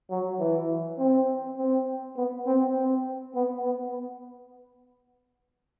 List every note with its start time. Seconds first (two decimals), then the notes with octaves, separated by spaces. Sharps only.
0.10 F#3
0.39 E3
0.98 C4
1.57 C4
2.16 B3
2.46 C4
2.75 C4
3.35 B3
3.64 B3